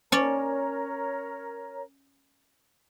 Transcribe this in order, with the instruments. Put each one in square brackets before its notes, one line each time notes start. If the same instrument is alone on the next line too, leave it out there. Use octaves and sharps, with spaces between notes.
[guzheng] C#4 D5 [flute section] A#4 C#5 A#5